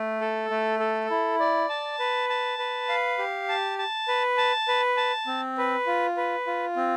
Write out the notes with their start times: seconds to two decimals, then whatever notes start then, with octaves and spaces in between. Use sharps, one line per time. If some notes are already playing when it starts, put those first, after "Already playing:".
Already playing: A3
0.21 A4
0.50 A3
0.80 A4
1.10 E4
1.40 D5
1.69 A5
1.99 B4
2.29 A5
2.58 B4
2.89 F5
3.19 G4
3.49 A5
3.79 A5
4.08 B4
4.37 A5
4.68 B4
4.97 A5
5.27 C4
5.58 B4
5.87 F4
6.17 B4
6.47 F4
6.76 C4